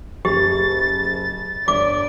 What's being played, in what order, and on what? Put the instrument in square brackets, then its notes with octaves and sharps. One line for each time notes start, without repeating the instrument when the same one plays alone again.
[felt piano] F#1 [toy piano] G4 [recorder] A6
[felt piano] G1 [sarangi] D5 [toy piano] D6